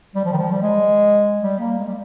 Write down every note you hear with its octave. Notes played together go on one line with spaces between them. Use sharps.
G3
F3
D#3
F3
G3
G#3
G3
A#3
G#3
G3